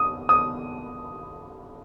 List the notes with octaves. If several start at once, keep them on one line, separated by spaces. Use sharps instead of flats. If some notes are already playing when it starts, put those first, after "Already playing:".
Already playing: D#6
D#6